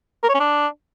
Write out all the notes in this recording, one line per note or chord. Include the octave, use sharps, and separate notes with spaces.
A#4
C#5
C#4
D4